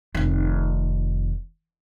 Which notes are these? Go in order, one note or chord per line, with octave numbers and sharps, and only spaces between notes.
F1 D#3